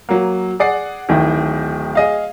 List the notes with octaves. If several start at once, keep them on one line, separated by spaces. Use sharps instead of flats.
F#3 A#3
G#4 D5 F#5 C7
D1 D#3 E4 G5
G#4 D#5 F5